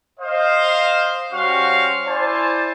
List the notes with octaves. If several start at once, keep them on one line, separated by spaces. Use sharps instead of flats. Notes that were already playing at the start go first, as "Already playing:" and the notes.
C5 D#5 F5
G3 C#4 F#4 C5 F5 C#6
E4 C5 D5 G#5 A5